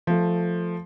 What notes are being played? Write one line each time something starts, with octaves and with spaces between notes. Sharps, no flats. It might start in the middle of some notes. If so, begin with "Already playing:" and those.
F3 A3